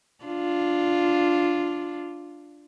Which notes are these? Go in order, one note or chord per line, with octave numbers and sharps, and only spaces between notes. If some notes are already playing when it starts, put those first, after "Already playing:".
D4 F4